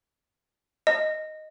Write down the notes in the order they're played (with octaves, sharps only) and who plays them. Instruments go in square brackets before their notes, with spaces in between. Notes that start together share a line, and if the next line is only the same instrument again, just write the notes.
[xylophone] D#5